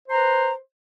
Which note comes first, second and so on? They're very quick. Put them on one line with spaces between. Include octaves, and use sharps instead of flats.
C5 A#5 B4